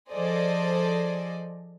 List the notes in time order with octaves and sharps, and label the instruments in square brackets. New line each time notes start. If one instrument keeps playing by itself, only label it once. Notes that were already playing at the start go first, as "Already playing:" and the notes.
[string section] F3 G#4 A4 C5 D5 D#5